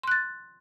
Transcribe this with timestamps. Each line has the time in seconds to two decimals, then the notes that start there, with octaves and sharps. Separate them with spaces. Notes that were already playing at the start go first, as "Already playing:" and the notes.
0.03 C6
0.07 F#6
0.11 A6